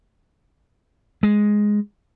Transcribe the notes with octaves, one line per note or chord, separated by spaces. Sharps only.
G#3